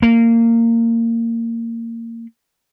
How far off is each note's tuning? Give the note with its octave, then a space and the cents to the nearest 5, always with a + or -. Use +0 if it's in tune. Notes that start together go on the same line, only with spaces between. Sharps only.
A#3 -20